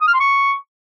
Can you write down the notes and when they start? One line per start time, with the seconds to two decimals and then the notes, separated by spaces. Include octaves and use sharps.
0.01 D#6
0.07 F6
0.14 C6
0.20 C#6